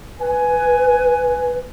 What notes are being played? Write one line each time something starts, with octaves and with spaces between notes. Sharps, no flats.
B4 G#5